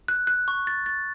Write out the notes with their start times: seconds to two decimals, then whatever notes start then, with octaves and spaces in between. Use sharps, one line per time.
0.08 F#6
0.27 F#6
0.48 C#6
0.67 A6
0.86 A6